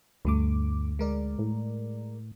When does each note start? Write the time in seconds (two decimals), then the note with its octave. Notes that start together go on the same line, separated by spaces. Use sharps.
0.25 D2 G2 A3 D6
0.99 G#3 A#4 D5
1.39 A2